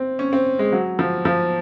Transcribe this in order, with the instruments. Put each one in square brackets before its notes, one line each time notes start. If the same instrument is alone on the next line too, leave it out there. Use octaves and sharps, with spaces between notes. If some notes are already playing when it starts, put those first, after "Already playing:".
Already playing: [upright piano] C4
C#4
C4
G#3
F#3
F3
F3